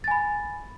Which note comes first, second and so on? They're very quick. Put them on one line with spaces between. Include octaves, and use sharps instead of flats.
A6 G#5 B5